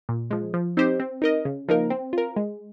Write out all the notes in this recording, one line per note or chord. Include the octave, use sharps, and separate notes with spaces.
A#2
F3 G#3
F3
C4 D#4 G4 C5
C4
D#4 A#4 D#5
C#3
F3 A#3 D#4 A#4
C4
F4 A#4
G#3